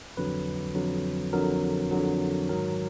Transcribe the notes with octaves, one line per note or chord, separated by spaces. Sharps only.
F2 D3 F#3 B4
F2 D3 F#3
F2 D3 F#3 A#4
F2 D3 F#3
G#2 D#3 F#3 A#4